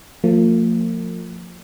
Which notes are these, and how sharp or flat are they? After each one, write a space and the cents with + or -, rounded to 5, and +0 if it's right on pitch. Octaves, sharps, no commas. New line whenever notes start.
F3 +15 A#3 -45